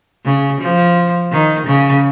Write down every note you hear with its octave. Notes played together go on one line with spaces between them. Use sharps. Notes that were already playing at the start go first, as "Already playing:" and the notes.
C#3
F3
D#3
C#3